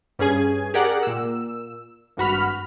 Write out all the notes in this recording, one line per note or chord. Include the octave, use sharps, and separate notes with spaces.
G2 C#4 G#4 G#5
G4 G#4 A#4 D5 F#5
A#2 E6
G#1 G2 F#4 B5 F6